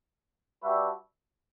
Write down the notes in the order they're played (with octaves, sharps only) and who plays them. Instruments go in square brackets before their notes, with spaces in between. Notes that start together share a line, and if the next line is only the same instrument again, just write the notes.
[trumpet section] G3 D4 F#4 B4 E5